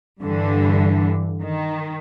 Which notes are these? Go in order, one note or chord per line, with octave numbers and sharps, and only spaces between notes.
G2 D3 E3
D#3